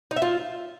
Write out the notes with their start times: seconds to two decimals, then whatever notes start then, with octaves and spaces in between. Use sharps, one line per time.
0.11 D#4
0.16 E5
0.22 F4